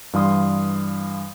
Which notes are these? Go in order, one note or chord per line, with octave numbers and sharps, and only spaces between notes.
G2 E3 G3 F5 C6 D#6